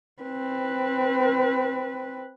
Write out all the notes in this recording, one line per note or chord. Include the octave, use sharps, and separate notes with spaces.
C4 B4